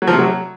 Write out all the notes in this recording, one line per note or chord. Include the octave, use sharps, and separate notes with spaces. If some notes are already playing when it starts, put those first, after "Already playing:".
F#3
F3
C3
F#3